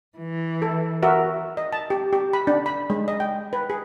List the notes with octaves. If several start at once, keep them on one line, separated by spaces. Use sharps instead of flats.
E3
A4
F#4 A#4 E5
D#5
A5
G4
G4
B5
D4
B5
G#3
D#5
G5
B4
G#4